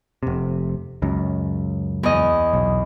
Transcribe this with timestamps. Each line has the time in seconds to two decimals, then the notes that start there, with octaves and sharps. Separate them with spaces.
0.23 F1 C3
1.02 C#2 F#2
2.03 E2 D#5
2.53 B1